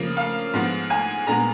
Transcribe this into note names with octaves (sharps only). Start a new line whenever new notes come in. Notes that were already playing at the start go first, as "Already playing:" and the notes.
Already playing: C#3 F3 A#3
F5
G#2 F3 B3
G#5
A#2 G#3 B3 A#5